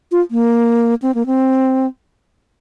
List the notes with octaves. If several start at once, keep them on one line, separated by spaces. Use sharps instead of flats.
F4
A#3
C4
A#3
C4